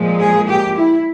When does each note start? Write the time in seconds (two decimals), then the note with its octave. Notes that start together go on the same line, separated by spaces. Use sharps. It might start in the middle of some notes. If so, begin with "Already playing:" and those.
Already playing: A#2 F3 G#3
0.20 G#4
0.48 G4
0.76 E4